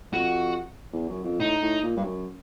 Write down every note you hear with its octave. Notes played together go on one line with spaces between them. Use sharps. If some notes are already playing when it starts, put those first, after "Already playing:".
F2 F#4
E2
F#2
F2
A2 D#4
A2
A#2
G2
F#2